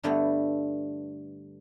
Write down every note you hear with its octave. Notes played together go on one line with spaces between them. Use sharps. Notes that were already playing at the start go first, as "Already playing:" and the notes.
G2 D3 G3 A3 B3